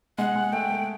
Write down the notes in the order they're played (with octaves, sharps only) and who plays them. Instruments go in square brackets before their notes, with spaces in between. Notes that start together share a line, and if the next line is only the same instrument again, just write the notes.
[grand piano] G#3 [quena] F#5
[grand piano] G#3
[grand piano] A3 [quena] G5
[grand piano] A3